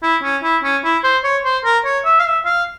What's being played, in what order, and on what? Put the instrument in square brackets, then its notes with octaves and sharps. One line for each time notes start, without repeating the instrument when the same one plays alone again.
[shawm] E4
C#4
E4
C#4
E4
C5
C#5
C5
A#4
C#5
E5
F5
E5
F5